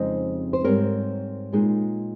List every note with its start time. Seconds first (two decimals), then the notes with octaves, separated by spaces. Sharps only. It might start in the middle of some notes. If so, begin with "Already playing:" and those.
Already playing: F2 C#3 G#3 C4 D#4 C5 D#5
0.53 C5
0.64 G#2 G3 C4 A#4 C#5
1.53 A#2 G#3 D#4